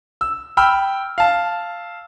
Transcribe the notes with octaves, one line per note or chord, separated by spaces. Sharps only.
E6
G5 B5 E6 F6
F5 A5